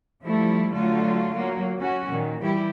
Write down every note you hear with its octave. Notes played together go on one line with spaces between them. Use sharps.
F3 G3 A3 E4
D3 F#3 A3 F4
F#3 A#3
C#4 F#4
A#2 D#3
E3 G3 E4 G4